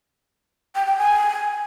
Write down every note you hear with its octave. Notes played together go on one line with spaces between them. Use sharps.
G5
G5
G#5